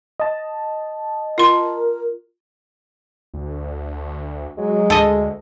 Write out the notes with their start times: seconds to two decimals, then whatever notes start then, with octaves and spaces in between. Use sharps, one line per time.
0.20 D#5 A5
1.38 F4 A#4 C6
3.34 D2
4.58 F#3 G#3
4.90 D2 A4 D#5